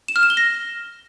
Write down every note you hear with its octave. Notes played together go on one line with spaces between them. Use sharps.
E7
F6
E7
G7
A#6